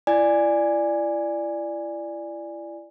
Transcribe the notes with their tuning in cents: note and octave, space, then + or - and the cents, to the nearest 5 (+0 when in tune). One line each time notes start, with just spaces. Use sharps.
E4 +35 D5 +5 G#5 -10